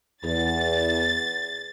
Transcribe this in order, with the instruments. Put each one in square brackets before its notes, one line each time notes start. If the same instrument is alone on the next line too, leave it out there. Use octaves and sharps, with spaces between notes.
[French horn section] E2 [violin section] A6